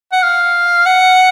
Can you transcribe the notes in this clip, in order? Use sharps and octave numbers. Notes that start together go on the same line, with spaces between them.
F#5
F5
F#5